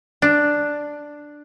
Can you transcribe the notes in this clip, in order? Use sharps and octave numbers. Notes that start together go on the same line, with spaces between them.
D4